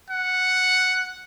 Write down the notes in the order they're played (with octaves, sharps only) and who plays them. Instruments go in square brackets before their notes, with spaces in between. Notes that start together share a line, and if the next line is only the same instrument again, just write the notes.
[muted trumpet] F#5